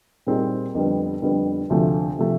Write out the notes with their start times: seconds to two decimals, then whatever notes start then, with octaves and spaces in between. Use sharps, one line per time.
0.27 A#2 G3 C4 D#4 G#4
0.75 F2 D3 G3 B3
1.22 F2 D3 G3 B3
1.70 D2 C3 F3 A3
2.19 C3 F3 A3